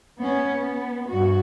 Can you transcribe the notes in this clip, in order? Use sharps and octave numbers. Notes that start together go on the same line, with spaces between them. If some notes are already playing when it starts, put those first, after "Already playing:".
B3 C#4
B3
G2 F#4